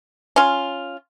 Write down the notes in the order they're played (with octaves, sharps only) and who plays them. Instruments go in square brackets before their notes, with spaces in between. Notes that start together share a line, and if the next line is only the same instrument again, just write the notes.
[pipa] C#4 F4